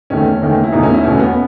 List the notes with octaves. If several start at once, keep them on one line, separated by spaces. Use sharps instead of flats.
E2 D#3 A3 C#4
E2 D#3 A3
E4
E2 B2 A3 D#4
C#4
E4
E2 B2 A3 C#4
B3